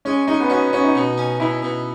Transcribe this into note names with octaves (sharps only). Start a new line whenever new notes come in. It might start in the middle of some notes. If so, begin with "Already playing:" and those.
G#3 C#4
G#3 D#4
B3
C#4 F#4
C#4 F#4
D#4
B2
C#4
B2 E4
B2